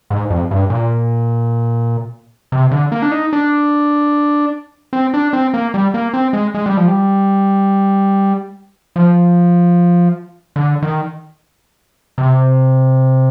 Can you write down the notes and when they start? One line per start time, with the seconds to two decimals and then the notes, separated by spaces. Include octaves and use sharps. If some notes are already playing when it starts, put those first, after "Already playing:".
0.10 G#2
0.30 F2
0.51 G2
0.70 A#2
2.52 C3
2.71 D3
2.92 A#3
3.02 D4
3.12 D#4
3.33 D4
4.93 C4
5.14 D4
5.33 C4
5.54 A#3
5.74 G3
5.94 A#3
6.14 C4
6.33 G#3
6.54 G#3
6.66 G3
6.77 F3
6.88 G3
8.96 F3
10.56 D3
10.82 D#3
12.18 C3